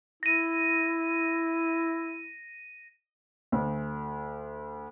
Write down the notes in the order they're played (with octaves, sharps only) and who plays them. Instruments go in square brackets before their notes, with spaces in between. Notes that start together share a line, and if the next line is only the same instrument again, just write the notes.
[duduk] E4 [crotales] A#6 D#7
[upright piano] D2